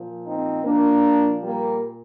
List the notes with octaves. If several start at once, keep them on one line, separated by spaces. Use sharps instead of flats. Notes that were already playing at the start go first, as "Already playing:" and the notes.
Already playing: A#2 F3
C4 D#4
A#2 F3 A#3 D4
G3 A#3